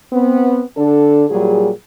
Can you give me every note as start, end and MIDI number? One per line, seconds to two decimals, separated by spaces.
0.13 0.62 59
0.13 0.62 60
0.77 1.25 50
0.77 1.25 62
0.77 1.25 69
1.30 1.70 46
1.30 1.70 54
1.30 1.70 55
1.30 1.70 68